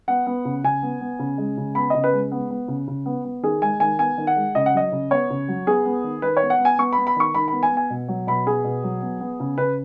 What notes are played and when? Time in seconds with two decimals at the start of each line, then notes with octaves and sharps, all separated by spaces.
0.08 B3 F#5
0.27 B3
0.45 C#3
0.64 C#3 G#5
0.83 B3
1.01 B3
1.19 C#3
1.38 G#3
1.58 C#3
1.75 B3 B5
1.90 C#3 D#5
2.04 B4
2.13 G#3
2.32 B3
2.51 B3
2.68 C#3
2.88 C#3
3.06 B3
3.25 B3
3.43 D#3 G#4
3.62 G#3 G#5
3.80 D#3 G#5
3.99 B3 G#5
4.18 D#3
4.27 F#5
4.36 G#3
4.55 C#3 D#5
4.66 F#5
4.74 F#3 D#5
4.92 C#3
5.11 B3 C#5
5.30 C#3
5.48 F#3
5.66 B3 G#4
5.85 B3
6.04 D#3
6.22 D#3 B4
6.37 C#5
6.42 B3
6.50 F#5
6.59 B3
6.65 G#5
6.78 B3 C#6
6.93 B5
6.98 B3
7.07 B5
7.16 D#3 C#6
7.34 D#3 B5
7.48 B3 B5
7.63 G#5
7.71 B3
7.77 G#5
7.90 B2
8.08 F#3
8.27 B2 B5
8.46 B3 G#4
8.64 B2
8.84 F#3
9.02 B3
9.20 B3
9.40 C#3
9.58 C#3 B4